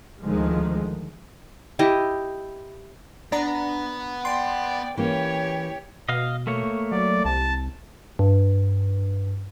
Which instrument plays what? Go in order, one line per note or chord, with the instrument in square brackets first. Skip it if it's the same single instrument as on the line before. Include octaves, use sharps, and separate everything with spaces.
[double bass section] D2 D#3 F3 G#3
[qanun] E4 G4 D#5
[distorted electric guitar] B3 [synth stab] D4 A#5
[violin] D5 G5 [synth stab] C6
[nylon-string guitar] E3 A#3 C#4 [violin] G4 C#5
[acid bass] B2 [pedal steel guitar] D#5 F5
[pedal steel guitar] A3 A#3 C#5
[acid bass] F#3 [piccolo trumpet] D5
[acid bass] C2 [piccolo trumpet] A5
[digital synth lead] G2